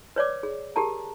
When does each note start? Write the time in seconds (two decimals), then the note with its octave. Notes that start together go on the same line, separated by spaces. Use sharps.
0.16 B4 C#5 D5 D6
0.43 G#4
0.76 G4 G#4 A#4 A5 A#5